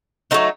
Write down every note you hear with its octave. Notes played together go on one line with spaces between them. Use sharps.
F#3 A3 C4 D#4